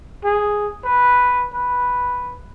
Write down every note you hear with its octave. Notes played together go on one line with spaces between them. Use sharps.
G#4
B4
B4